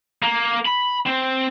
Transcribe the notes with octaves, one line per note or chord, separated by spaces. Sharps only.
A#3
B5
C4